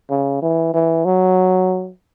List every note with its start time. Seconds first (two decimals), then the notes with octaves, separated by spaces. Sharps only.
0.10 C#3
0.42 E3
0.74 E3
1.05 F#3